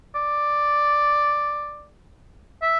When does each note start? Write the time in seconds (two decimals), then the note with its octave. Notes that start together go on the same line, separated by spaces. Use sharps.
0.15 D5
2.62 E5